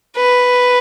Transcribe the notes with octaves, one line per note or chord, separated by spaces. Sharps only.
B4